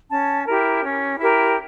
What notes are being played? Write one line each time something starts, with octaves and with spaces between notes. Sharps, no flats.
C#4 A5
E4 G4 A#4
C#4
E4 G4 A#4